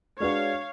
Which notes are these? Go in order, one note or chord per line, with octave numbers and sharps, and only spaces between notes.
G#3 D4 F#4 B4 C#5 F5